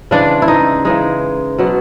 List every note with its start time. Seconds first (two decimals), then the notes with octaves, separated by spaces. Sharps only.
0.11 C#3 E3 G#3 D4
0.42 E4
0.48 D#4
0.85 C#3 E3 G#3 D#4
1.58 B2 F#3 B3